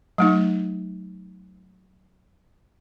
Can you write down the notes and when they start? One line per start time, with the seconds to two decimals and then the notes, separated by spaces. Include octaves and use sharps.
0.18 F#3 A3 D#4